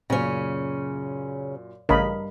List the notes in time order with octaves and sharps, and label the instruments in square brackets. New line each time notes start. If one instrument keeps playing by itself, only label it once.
[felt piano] F#2 A#2 [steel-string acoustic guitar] C#3 C#4
[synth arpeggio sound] A1 C#3 [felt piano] G2 F5 [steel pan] A#4 D#5 B5